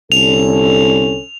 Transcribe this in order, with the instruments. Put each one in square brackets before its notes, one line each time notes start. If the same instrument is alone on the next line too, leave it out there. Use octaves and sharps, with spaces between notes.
[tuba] C2 [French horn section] D3 C#4 A4 [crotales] F7